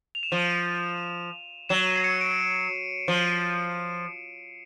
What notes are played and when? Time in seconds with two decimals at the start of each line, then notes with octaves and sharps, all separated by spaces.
0.15 F7
0.23 E7
0.31 F3 D#7
1.69 F#3 E7
1.87 D#7
1.96 C7
2.04 C#7
2.21 D7
3.08 F3